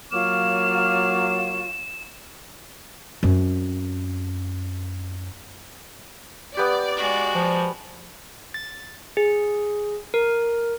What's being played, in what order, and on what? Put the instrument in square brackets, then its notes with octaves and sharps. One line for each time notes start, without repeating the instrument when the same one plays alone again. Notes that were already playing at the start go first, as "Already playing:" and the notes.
[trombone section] F#3 A#3 [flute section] F4 C#5 C#6 [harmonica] D6 F6 [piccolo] E7
[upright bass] F#2 C4
[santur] B3 G4 [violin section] D5
[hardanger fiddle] G#3 F#4
[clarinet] F3
[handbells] A6
G#4
A#4